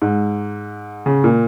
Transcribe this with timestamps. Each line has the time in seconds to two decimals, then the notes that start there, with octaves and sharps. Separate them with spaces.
0.02 G#2
1.06 C#3
1.24 A#2